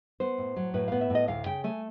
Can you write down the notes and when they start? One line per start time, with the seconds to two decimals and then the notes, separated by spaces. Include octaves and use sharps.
0.20 B3 C5
0.38 A2
0.56 F#3
0.74 A2 B4
0.88 B3 F5
1.01 E5
1.10 A2 D#5
1.28 D2 F5
1.46 C#3 G5
1.64 A3 G#5